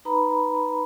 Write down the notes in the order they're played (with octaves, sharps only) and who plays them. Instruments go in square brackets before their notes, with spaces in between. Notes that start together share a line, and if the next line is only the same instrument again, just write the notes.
[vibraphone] D#4 B4 A#5 B5